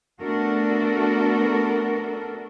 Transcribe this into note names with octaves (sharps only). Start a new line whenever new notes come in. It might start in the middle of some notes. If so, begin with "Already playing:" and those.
A3 B3 D4 F#4 A4 A#4